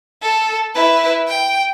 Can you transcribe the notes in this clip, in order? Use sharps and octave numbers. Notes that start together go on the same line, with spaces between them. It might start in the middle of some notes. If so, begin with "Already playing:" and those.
A4
E4 B4
G5